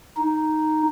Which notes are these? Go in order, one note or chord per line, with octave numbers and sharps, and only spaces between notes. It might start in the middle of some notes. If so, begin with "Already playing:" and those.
D#4